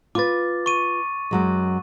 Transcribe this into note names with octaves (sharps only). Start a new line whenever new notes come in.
F4 B4 D6 A6
C#6 D#7
F#2 F#3 G#3